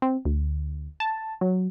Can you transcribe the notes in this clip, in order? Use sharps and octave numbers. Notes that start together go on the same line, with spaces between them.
C4
D2
A5
F#3